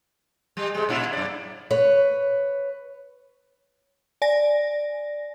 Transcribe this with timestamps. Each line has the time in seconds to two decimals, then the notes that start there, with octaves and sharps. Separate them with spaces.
0.57 G3
0.75 C3 G#3
0.89 A#2 E4
1.13 F#2 D5
1.71 B4 C#5
4.22 D5 G#5 A#6